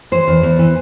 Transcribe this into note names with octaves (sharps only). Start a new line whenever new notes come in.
E3 C5
E2
E2
E3